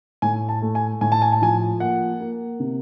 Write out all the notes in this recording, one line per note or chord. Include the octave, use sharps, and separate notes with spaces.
A2 G#5
A5
A3
G#5
A2 G#5
A5
G#5
A5
F3 G#5
A#3 F#5
A#3
C3